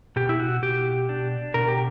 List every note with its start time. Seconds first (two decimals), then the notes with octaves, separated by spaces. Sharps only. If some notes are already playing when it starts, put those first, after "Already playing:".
0.16 B2 G4
0.29 E4
0.40 F#4
0.62 B2 G4
1.09 D4
1.54 B2 A#4
1.68 G4